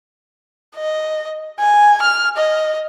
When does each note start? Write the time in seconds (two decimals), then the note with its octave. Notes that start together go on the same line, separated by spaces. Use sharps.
0.76 D#5
1.60 G#5
2.03 F6
2.37 D#5